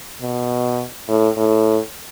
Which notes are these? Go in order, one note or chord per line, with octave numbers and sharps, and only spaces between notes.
B2
A2
A2